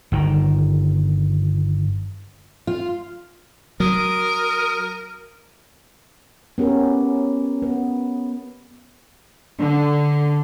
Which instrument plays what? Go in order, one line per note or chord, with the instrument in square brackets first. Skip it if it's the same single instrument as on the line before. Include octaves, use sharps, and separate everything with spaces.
[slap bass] G1 D#3
[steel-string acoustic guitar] F4
[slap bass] F#3 [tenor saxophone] A#4 [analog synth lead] D#6
[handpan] B3 C#4 G4 A#4
B3
[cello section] D3